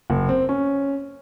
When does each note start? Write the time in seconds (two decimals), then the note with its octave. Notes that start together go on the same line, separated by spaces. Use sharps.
0.10 F#1
0.29 C4
0.49 C#4